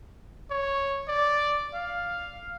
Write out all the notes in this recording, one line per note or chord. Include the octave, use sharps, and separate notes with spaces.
C#5
D5
F5